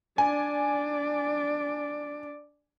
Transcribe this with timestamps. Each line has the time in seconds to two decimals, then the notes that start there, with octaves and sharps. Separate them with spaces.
0.18 D4 D5 G#5